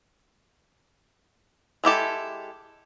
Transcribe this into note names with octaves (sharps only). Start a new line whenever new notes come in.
G#3 E4 G4 A4